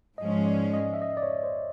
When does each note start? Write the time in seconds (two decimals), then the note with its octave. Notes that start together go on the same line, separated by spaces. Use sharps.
0.18 G#2 F3 G#3 C#4 D#5
0.46 D5
0.74 D#5
0.94 E5
1.02 D#5
1.17 D5
1.23 C#5
1.43 C5